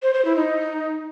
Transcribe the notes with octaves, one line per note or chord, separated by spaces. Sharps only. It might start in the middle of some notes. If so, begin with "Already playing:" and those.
C5
C5
E4
D#4